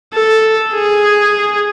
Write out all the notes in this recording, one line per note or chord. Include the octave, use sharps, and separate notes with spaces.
A4
G#4